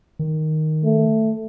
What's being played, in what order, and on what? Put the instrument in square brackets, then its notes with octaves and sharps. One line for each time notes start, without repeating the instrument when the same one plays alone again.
[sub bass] D#3
[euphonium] A3